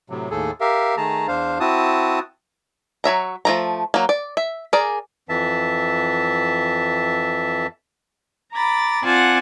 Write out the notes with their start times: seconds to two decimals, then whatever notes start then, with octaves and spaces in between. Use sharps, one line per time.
0.10 A2 C3 F#3
0.30 D#2 A2 G#4 A4
0.61 G4 A#4 E5 F5
0.97 D#3 A3 G#4 A5 A#5
1.28 E2 D4 C5 F5
1.60 C4 E4 F#4 A5 D#6
3.04 F#3 C#5 E5 A#5
3.45 F3 A3 A#5
3.94 F#3 A#3
4.09 D5
4.37 E5
4.73 G#4 A#4 D5
5.29 F2 E3 E5 A5
8.53 A#5 B5 D6 A6
9.04 C4 F4 D5 F#5 G#5 A5